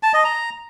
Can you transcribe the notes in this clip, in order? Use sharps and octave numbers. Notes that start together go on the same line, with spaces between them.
A5
D#5
A#5